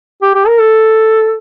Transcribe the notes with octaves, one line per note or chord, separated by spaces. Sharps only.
G4
G4
A#4
A4